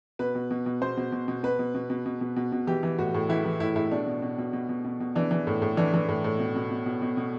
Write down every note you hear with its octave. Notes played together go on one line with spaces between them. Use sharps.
B2 B4
B2
B2
B2
B2 C5
B2
B2
B2
B2 B4
B2
B2
B2
B2
B2
B2
B2
E3 G4
E3
A2 F#4
A2
E3 E4
E3
A2 E4
A2 E4
B2 D4
B2
B2
B2
B2
B2
B2
B2
E3 D4
E3
A2
A2
E3 D4
E3
A2
A2
B2
B2
B2
B2
B2
B2